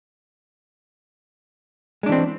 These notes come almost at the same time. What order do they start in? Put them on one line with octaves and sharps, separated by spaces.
G#3 D4 E3 C4